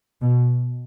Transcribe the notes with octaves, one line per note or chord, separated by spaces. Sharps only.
B2